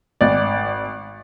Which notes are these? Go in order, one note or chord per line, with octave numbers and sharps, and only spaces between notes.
G#1 D5